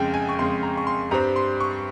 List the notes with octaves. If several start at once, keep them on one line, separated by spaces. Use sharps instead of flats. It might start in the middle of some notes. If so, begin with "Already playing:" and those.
Already playing: F2 C#3 G#3 G5
G#5
C#6
F2 C#3 G#3 C6
A#5
C#6
C6
G2 G3 C4 A#5
C6
C#6